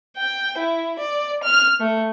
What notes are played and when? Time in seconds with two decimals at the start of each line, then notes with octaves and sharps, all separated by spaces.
0.17 G5
0.57 E4
0.99 D5
1.43 F6
1.80 A3